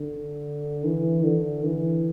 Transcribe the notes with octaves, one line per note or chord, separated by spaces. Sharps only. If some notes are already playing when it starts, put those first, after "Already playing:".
Already playing: D3
E3
D3
E3